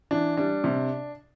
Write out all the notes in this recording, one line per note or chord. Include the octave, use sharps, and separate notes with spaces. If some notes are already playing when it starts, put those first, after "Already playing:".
E3 D4
G3 D4
C3